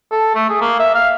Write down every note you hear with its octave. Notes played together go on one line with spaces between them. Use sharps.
A4
A3
G#4
A#3
E5
F5